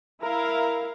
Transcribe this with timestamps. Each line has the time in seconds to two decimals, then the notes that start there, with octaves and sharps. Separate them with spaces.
0.22 E4 A#4 F5